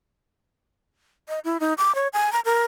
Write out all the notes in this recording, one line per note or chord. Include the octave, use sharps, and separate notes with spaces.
D#5
E4
D#4
D6
C#5
G#5
A#5
A#4